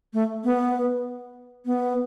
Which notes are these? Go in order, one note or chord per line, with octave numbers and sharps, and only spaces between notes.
A3
B3
B3